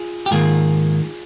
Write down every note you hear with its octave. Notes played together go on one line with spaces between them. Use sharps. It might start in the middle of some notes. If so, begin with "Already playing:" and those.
Already playing: F4 G#4
G4
G#2 D#3 A#3 F4 G#4